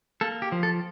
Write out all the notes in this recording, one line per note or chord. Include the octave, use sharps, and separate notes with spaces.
A#3 A4
G4
F3
A4